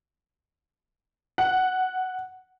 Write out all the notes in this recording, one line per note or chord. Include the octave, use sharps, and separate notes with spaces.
F#5